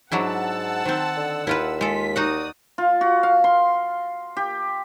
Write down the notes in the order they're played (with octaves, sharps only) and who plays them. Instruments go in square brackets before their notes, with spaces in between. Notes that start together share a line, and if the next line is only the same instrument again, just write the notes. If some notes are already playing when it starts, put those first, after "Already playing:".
[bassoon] G#2 [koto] F#3 D4 E4 [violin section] F#5 A5 E6
[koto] D#3 C4 [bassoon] C5
[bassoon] D3
[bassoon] D#2 [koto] E4 F4 B4
[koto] G#3 A4 [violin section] F4 B6
[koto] D#4 F#4 F#5 [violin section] D5 D#6
[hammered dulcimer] F4
F#4
F5
C6
G4